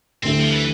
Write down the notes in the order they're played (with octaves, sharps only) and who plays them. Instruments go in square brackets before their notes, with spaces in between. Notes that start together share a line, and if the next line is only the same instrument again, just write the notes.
[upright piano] D2 D3 A3 E4 G4 [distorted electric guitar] C4
[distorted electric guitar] F3
E3